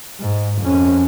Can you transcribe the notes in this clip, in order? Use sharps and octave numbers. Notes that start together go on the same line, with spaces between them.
G#2
F2 C#4